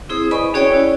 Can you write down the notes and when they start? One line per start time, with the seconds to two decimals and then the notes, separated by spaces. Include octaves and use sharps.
0.09 C4 E4 G#4 C5 D#6
0.31 B4 D5 D#5 G#5 B5 C#6
0.54 C#4 F#4 G#4 C#5 D5 G5
0.72 E4